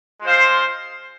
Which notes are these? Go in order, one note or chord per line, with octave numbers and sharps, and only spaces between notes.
G#3 F4 C5 F5